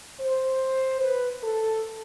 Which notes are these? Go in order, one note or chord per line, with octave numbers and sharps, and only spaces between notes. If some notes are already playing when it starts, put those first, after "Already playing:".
C5
B4
A4